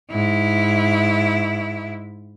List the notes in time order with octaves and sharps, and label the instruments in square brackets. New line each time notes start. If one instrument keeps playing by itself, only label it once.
[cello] G#2 E4